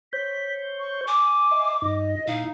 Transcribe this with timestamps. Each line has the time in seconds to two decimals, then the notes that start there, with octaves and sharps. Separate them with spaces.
0.13 C5 C#5 G6 B6
0.79 C#6
1.08 G#5 D6
1.51 D#5 E5 C6
1.82 G2 D#4 D#5
2.27 A#2 D#4 E4 F5